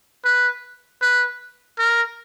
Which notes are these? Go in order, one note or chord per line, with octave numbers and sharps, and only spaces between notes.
B4
B4
A#4